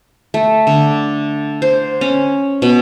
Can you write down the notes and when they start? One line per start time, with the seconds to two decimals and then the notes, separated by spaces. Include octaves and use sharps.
0.34 A3
0.67 D3
1.62 C5
2.01 C#4
2.62 B2